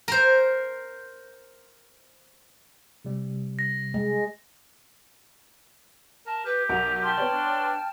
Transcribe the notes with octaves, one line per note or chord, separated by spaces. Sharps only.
A#4 C5
C3 G3
A#6
G#3
A#4 A5
G4 B4
B1 F#4 A#4 A#5
G5 A5 C6 F6
B3 C#5 D5
D4